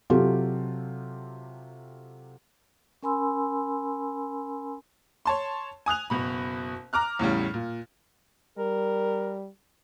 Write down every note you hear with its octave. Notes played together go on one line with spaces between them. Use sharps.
C3 F#3 F4 G4 A4
C#4 A#4 G#5 B5 C6 E6
C#5 A5 C6
G#5 D#6 F#6 F7
F#1 B2 B5
A#5 D6 F6 F#6
E2 A2 C#3 G3
A#2
G3 A#4